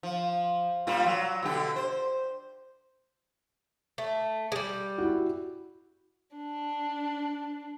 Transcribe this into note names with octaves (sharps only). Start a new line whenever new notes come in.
F3
A#2 G3 F4
F#3
B2 D3 G4
C5
A3
G3 G#3
E4 F#4
D4